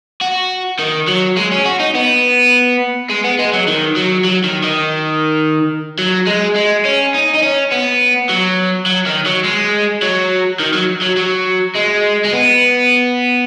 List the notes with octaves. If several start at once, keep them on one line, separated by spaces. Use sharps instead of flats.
F#4
D#3
F#3
G#3
C#4
F#4
D#4
B3
G#3
B3
G#3
F#3
D#3
F#3
F#3
D#3
D#3
F#3
G#3
G#3
C#4
D#4
D#4
C#4
B3
F#3
F#3
D#3
F#3
G#3
F#3
D#3
F#3
F#3
F#3
G#3
G#3
B3